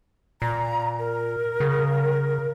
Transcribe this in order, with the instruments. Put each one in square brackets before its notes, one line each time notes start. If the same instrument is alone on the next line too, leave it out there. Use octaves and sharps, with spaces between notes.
[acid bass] A#2 [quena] A#5
[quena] A#4
[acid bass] C#3